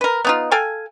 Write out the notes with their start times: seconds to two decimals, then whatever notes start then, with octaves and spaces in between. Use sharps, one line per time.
0.01 A#4 B4
0.25 B3 D#4 F4
0.51 A4 F5 G5 G#5